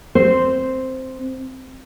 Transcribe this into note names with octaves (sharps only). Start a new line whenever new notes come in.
C4 C5